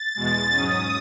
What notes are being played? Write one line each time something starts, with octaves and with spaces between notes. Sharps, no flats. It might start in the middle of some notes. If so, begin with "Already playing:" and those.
Already playing: A6
E2 B2 G#3
G#2 F#3 C#4 D#6